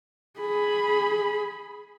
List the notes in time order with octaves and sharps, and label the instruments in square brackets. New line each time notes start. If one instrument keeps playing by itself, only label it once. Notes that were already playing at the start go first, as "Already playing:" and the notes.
[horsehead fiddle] G#4 B5